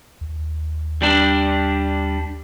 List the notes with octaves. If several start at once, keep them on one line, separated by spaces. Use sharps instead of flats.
D#2
G3 D4